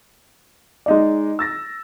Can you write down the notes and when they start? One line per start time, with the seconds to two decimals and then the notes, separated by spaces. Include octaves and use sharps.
0.86 G#3 D#4 D5
1.39 E6 A6 A#6